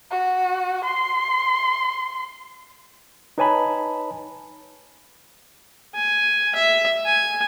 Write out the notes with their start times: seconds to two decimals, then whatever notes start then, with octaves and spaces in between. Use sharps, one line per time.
0.11 F#4
0.84 C6
3.38 D#4 B4 C#5 G#5 A5 B5
5.95 G#5
6.55 E5
7.06 G#5